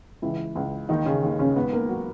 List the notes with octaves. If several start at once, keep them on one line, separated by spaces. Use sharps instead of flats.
C#2 E3 E4
C#2
D#2 D#3 D#4
C#3 C#4
D#2
C#3 C#4
G#2 B3 B4
B4
A#3 A#4
F#3 F#4